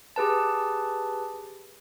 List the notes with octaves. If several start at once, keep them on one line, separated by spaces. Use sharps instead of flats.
G4 G#4 B4 A5